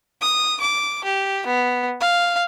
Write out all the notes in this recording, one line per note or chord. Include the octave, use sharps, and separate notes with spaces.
D#6
D6
G4
B3
F5